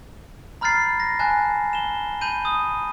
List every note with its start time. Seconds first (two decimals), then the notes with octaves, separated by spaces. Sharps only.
0.61 A#5 B5 F6 G6 A6 C7
1.00 A#6
1.19 G#5 A5 F#6
1.73 E7 G7
2.21 A5 B5 G6 D#7
2.45 D#6